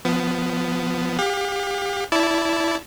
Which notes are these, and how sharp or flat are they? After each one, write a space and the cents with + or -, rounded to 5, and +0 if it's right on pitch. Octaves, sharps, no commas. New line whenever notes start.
F3 +0 B3 +15
G4 +30 F5 +45
E4 +0 D5 -25 A5 +0